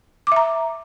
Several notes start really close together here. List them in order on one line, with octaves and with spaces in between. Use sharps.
D6 E5 A#5